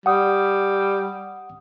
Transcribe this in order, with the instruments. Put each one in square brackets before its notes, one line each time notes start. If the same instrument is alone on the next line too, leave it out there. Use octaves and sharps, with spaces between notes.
[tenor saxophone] G3 [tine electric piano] F#5 D#6